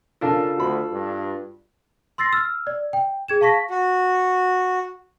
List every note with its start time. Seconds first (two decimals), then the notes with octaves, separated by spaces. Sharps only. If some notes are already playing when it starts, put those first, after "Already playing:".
0.21 C#3 D4 F4 A4 A#4 F5 A5
0.57 D2 F#4 B5
0.92 G2
2.18 C6 E6 A6 A#6 C7
2.33 E6 F6
2.67 D5
2.93 G5
3.28 G#4 G#6 E7
3.41 F5 A5 C#6 A#6 B6
3.70 F#4